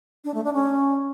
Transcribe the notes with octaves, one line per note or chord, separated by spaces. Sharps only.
D4
A3
D4
C#4